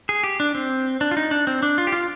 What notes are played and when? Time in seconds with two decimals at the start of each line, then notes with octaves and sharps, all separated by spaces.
0.09 G#4
0.24 G4
0.40 D4
0.55 C4
1.01 D4
1.11 F4
1.17 D#4
1.31 D4
1.47 C4
1.63 D4
1.78 F4
1.87 G4
1.92 F4